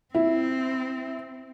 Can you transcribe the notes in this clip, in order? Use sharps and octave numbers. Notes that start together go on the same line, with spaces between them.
C4 E4